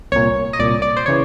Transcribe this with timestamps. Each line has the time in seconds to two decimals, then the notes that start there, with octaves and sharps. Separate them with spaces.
0.12 C2 A#2 C#5
0.53 D#5
0.59 C2 A#2 D5
0.82 D5
0.97 C5
1.06 C#3 E3 C#5